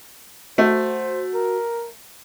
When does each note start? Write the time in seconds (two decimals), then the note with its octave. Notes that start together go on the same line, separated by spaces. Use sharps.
0.58 A3 F#4 C5
1.34 A#4